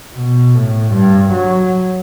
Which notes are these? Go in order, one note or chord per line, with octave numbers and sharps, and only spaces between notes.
B2
A2
G2
F#3